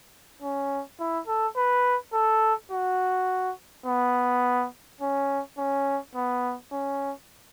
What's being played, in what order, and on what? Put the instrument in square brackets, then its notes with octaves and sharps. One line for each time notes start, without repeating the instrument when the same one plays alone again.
[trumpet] C#4
E4
A4
B4
A4
F#4
B3
C#4
C#4
B3
C#4